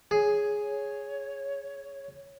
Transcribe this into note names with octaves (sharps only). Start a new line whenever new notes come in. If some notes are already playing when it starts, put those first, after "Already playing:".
G#4 C#5